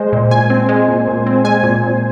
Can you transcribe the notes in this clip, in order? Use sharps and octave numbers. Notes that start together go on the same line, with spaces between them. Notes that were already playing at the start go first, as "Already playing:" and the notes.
Already playing: G#3 C5
A#2
A#2 G#5
C4
G#3
A#2
A#2
C4
G#3 G#5
A#2
A#2